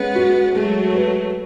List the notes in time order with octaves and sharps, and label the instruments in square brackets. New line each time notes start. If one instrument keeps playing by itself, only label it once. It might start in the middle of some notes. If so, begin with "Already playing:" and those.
Already playing: [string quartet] G#3 B3 [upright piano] C#4
[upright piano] F#4
[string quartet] F#3 A3 [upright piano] G#3
[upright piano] B4